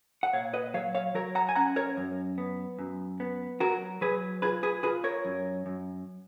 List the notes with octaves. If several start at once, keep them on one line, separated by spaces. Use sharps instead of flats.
F#5
A#2 C#5 F5
B4 D#5
F#3 C#5 F5
C#5 F5
F#3 A#4 C#5
F#5 A#5
G#5
C#4 F#5 A#5
A#4 C#5
F#2
B3
F#2
B3
F#3 F#4 A#4
F#3 G#4 B4
F4 G#4 B4
G#4 B4
F4 G#4 B4
A#4 C#5
F#2
F#2